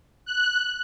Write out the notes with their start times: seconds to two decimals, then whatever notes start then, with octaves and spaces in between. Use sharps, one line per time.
0.25 F#6